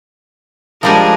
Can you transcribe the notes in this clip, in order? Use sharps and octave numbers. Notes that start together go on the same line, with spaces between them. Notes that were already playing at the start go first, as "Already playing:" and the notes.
F3 G3 G#3 D4 G#4 A#4